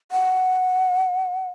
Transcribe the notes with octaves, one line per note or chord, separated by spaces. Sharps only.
F#5